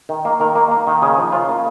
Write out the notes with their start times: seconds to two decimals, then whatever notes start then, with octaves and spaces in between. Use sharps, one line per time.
0.09 D#3
0.25 A#3
0.40 D#3 A#4
0.55 A#3
0.71 A#3
0.87 D#3
1.02 C#3 G#4
1.18 F3
1.33 C#3 F4
1.49 A#3